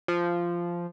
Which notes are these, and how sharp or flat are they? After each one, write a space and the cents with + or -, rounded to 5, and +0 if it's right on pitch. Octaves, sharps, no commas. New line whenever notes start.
F3 -10